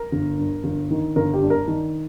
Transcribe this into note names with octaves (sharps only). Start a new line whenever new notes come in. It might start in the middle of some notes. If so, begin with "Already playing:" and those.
Already playing: A#4
G1
G2
G1
D#3
G1 A#4
G4
G2
A#4
D#3